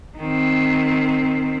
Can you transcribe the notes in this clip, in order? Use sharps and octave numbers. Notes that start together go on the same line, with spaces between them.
D#3 C4